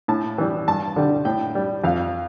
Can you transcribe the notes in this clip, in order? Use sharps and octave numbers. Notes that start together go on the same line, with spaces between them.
A2 A5
E3 G3
G2 A5
D3 G3
A2 G5
G3
F2 F5